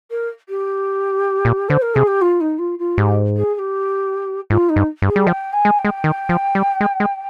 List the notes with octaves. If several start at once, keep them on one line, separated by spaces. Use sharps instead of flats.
A#4
G4
A#2
D3 C5
A#4
C3 G#4
G4
F4
D#4
F4
F4
G#2 G4
G#4
G#4
G4
G#2 F4
D#4
G2
G2
G#4
G3
F3 G5
G#5
G#3
G5
G#3
D#3
F3
G3
G#3
G#3